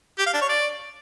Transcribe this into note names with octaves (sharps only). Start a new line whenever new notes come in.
G4
F5
D4
C#5
D5